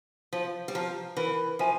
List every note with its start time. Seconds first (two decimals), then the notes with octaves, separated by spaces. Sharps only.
0.33 F3 F5
0.68 G3
0.75 F3 A#5 F6
1.17 E3 A#4
1.59 F3 E5 G#5